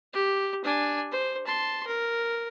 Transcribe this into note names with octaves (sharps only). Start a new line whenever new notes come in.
G4
D4 G#5
C5
A5 C6
A#4